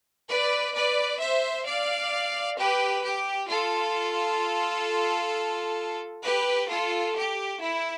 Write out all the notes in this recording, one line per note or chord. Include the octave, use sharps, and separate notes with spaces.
B4 D5
B4 D5
C5 E5
D5 F5
G4 B4
G4
F4 A4
G4 B4
F4 A4
G4
E4